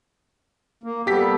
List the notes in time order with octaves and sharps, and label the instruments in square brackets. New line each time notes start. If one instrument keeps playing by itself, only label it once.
[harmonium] A#3
[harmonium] G3 B3 A4 [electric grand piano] G4 B6